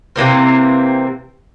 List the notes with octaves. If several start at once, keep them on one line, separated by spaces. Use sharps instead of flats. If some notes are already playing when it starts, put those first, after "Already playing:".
C3 E3 A#3 C4